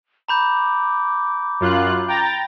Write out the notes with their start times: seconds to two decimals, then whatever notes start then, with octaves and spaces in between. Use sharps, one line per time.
0.28 A#5 B5 D6 G6
1.60 F#2 F4 F#6
2.08 G5 A#5 A6